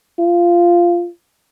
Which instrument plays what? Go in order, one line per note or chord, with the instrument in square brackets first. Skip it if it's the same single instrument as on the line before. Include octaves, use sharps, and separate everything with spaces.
[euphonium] F4